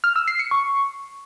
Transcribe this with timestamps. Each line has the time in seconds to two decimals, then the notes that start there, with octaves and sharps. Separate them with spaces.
0.04 F6
0.16 E6
0.28 C7
0.39 C#7
0.51 C#6